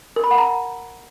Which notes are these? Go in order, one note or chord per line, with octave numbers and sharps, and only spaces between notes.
A#4
B5
F#5
A#5